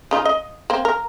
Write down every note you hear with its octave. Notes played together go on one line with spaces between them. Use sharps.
C#3 D#4 F4
D#5
A#3 C4
A#4